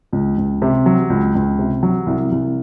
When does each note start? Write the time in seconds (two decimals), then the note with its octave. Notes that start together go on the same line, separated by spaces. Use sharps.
0.13 C#2
0.37 C#2
0.62 C3
0.86 F#3
1.10 C#2
1.35 C#2
1.59 C3
1.83 F#3
2.07 C2
2.32 C2